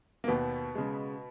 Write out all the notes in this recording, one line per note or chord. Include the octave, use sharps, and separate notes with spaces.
A#3
D#2 B2 B3
C#3 G#3